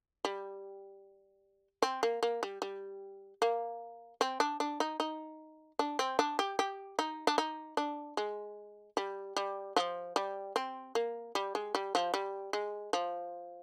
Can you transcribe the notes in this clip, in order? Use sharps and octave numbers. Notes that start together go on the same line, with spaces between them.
G3
C4
A#3
A#3
G3
G3
A#3
C4
D4
D4
D#4
D#4
D4
C4
D4
G4
G4
D#4
D4
D#4
D4
G#3
G3
G3
F3
G3
C4
A#3
G3
G#3
G3
F3
G3
G#3
F3